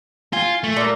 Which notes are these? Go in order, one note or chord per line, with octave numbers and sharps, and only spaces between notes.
F4 G#5
A3
A#2 A#4